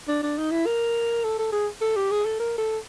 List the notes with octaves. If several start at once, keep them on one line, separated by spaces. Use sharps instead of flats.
D4
D4
D#4
E4
A#4
A4
A4
G#4
A4
G4
G#4
A4
A#4
A4